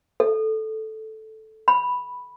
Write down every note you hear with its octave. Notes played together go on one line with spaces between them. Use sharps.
A4
B5